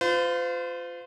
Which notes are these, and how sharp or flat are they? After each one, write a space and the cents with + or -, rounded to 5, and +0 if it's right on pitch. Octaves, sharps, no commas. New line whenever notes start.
F4 +5 C5 -40